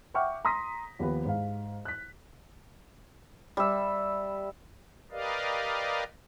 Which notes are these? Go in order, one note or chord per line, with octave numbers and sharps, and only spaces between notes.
E5 F#5 G5 C#6 D6 F6
A#5 C6 D#6 A#6 B6
D#2 F3 B3 F4 B4
G#2 F5
F#6 B6
G3 E5
G4 A#4 B4 D5 D#5 F5